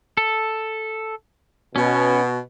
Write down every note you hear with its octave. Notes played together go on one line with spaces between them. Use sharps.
A4
B2 C#4